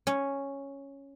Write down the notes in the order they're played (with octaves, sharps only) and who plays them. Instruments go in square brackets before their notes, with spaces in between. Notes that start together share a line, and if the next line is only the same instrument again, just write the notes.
[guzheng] C#4